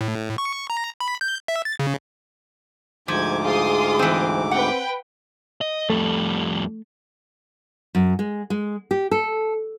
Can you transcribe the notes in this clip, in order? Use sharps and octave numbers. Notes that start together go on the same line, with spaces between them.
A2
C#6
A#5
B5
G6
E5
A6
C#3
D2 G#2 F3 D6 G#6
F4 G#4 C6 D#6
E3 C4
C4 B4 F#5 G5
D#5
F2 G3 A3
F#2
G#3
G#3
G4
A4